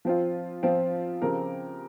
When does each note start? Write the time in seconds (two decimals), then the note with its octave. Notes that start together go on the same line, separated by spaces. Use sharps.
0.05 F3 C4 F4
0.63 F3 C4 F4
1.21 C#3 F3 C4 G4 A#4